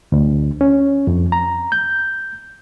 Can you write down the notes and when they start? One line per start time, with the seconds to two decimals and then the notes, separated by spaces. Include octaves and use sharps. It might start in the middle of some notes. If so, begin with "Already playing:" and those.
0.12 D2
0.61 C#4
1.07 F2
1.32 A#5
1.72 G6